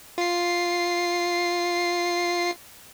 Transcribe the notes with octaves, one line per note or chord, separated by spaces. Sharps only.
F4 C7